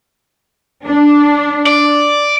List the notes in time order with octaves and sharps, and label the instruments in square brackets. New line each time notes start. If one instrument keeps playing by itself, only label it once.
[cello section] D4
[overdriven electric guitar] D5